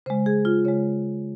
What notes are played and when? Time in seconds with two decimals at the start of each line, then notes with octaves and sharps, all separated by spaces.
0.06 C#3 G#3 C5
0.26 G#4
0.45 F4
0.65 C#3 G#3 C#5